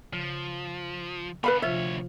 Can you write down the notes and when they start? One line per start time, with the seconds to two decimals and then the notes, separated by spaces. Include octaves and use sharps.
0.13 C#3 F3
1.44 B3 D4 B4 F5 B5
1.62 D2 C3 F3 F4 C#5 E5